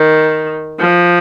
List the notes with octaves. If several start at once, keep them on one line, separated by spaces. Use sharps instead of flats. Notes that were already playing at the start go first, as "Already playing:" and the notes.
Already playing: D#3
F3